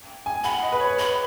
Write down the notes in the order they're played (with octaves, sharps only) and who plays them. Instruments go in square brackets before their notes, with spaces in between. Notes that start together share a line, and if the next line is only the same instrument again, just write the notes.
[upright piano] G#5
[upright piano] F#5 [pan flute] B5
[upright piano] D#5
B4
C#5
[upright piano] B4 [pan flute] B5